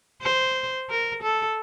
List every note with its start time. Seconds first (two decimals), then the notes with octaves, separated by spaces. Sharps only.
0.22 C5
0.90 A#4
1.23 A4